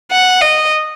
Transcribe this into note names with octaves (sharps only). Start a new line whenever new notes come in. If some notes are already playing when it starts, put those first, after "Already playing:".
F#5
D#5